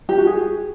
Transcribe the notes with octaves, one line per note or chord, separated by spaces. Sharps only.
G4
F#4
G#4